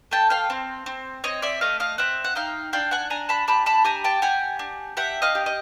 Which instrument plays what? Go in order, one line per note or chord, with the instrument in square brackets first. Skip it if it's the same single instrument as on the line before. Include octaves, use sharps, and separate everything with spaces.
[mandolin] A3 G5 A5
F5 G5
C4
C4
C4 C#5 D#5
D5 E5
A3 D#5 F5
D#5 F5
C4 E5 F#5
F#5
D#4 F5 G5
D4 F5 G5
F#5 G#5
D4 G#5 A#5
A5 B5
G4 A5 B5
A5 B5
G4 G#5 A#5
G5 A5
G4 F#5 G#5
D4
G4 E5 F#5
D#5 F5
G4
D#5